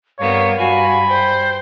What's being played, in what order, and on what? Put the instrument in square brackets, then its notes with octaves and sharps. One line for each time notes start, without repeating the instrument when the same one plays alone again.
[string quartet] G2 A#3 B3 [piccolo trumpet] C#5 [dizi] F5
[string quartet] G2 [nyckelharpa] F#4 G#5 [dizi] F5 [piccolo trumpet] B5
[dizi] C5 [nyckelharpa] G5